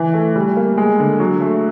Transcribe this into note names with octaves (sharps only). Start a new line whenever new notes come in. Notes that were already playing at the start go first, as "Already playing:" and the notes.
Already playing: E3
A3
G3
A#3
G#3
D3
F#3
A3